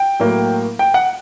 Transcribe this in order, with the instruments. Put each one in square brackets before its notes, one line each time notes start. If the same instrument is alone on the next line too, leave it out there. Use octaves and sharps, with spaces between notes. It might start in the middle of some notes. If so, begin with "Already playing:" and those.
Already playing: [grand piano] G5
A2 F#3 A#3
G5
F#5